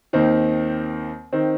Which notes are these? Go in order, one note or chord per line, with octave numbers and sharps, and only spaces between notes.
D#2 D#3 C4
D#3 C4